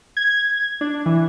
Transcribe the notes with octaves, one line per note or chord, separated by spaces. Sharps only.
G#6
D4
E3